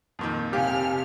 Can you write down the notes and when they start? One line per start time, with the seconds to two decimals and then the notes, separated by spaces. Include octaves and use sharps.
0.19 F2 A#2 D#3
0.53 C3 G4 F5 G#5 F6